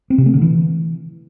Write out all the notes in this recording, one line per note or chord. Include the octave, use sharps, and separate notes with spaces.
C4
C3
A3
D3
E3